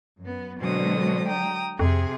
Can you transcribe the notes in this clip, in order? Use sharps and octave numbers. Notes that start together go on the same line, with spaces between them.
F#2 B3
B2 D3 F#3 G#3 C4 D#6
G5 A#5 D#6
F2 C3 G#4